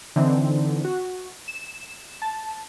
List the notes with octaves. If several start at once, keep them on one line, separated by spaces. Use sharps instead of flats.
D3 E3 C4 D#4
F#4
E7
A5